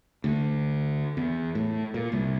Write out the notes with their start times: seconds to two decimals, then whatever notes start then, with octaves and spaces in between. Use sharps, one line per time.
0.24 D2
1.17 E2
1.55 A2
1.94 A#2
2.12 C2